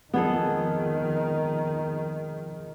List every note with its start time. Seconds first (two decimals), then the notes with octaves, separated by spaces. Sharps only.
0.14 F2 D#3 G#3 B3 G#4 A4